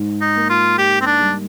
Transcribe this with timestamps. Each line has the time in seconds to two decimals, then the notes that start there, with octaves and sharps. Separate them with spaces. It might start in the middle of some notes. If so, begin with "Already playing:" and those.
Already playing: G#2
0.21 D#4
0.36 A#3
0.50 F4
0.78 D#4 G4
1.01 C4
1.06 D4
1.20 G3